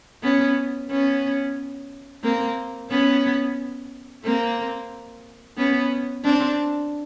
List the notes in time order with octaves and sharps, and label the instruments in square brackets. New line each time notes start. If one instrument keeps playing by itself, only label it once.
[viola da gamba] B3 C#4
B3 C#4
A#3 C4
B3 C#4
A#3 C4
B3 C#4
C4 D4